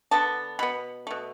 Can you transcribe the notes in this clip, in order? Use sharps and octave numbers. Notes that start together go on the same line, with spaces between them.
D3 B3 A5
B2 B3 B5
B2 A3